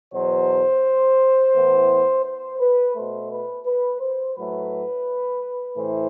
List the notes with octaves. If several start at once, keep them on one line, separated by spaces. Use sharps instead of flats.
E2 B2 F#3 C5
A2 E3 B3
C5
B4
B2 A3 C5
B4
B4
C5
A2 F#3 A3 B4
A2 E3 A3 C5